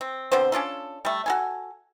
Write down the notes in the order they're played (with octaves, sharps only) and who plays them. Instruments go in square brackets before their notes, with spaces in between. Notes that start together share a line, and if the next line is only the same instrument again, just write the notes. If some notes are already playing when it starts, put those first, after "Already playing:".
[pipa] C4
B2 D3 C4 C5
C#4 D4 F4 A4
G3 A3
F#4 A4 G#5